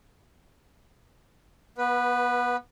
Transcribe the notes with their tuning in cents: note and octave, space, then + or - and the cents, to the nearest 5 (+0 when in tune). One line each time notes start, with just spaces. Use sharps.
B3 -25 B4 +0